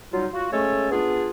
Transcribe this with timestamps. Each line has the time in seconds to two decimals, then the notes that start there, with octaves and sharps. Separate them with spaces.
0.12 F#3 G3 D#4 F4
0.33 F4 F#4
0.51 G#3 A3 C#4 A4 C#5
0.90 B3 D4 F4 G#4